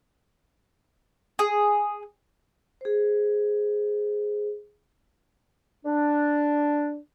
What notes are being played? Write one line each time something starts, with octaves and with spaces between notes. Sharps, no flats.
G#4
G#4 C5
D4